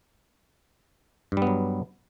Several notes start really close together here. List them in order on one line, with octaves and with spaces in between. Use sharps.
G2 G3 B3 F#3